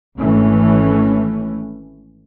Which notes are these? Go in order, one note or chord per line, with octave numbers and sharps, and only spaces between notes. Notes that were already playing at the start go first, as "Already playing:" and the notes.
G#1 E3 A3 C#4